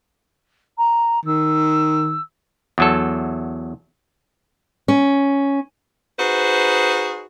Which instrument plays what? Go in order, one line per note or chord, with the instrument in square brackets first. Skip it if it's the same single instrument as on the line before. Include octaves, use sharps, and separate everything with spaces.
[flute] A#5
[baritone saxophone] D#3 [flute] E6
[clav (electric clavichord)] E2 F#3 A4
[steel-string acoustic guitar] C#4
[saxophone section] D#4 F#4 G#4 B4 C5